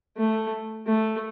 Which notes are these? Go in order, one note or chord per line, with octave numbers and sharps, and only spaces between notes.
A3
A3